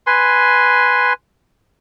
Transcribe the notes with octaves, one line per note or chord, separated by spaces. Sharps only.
B4 G#5 C6